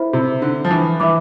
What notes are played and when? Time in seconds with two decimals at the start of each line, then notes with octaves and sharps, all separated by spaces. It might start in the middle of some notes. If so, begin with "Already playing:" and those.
Already playing: E4 A4 C5 E5 B5
0.13 C3
0.42 D3
0.65 F3
0.71 E3
1.00 E3 B4 E5 B5 D6